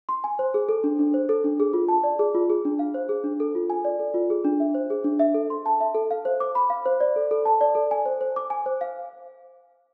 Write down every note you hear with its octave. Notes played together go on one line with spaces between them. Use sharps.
C6
G#5
C5
G#4
A4
D4
D4
C5
A4
D4
G#4
F4
A5
D5
G#4
F4
G#4
D4
F5
C5
G#4
D4
A4
F4
G#5
D5
A4
F4
G#4
D4
E5
C5
G#4
D4
E5
A4
C6
A5
E5
A4
F5
C5
D6
B5
F5
C5
D5
A4
A4
A5
D5
A4
G#5
C5
C5
D6
G#5
C5
F5